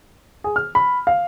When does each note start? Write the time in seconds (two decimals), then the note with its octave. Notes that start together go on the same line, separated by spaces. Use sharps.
0.44 G#4
0.56 F6
0.75 B5
1.07 F5